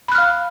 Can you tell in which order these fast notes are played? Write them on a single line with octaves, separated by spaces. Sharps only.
B5 F#6 F6 F5